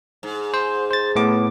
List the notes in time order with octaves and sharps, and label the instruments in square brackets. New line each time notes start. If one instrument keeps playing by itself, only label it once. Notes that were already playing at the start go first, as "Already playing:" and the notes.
[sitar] G#2
[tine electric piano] C5
C5 A6
A2 B3 D6